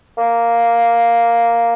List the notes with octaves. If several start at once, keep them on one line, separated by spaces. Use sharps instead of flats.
A#3